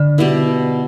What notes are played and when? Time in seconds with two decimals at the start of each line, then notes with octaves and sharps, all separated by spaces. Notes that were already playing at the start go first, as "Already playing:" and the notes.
Already playing: D3 D4 B4
0.18 B2 G3 B3 E4